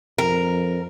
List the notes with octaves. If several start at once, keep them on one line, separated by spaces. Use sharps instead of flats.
F2 A#4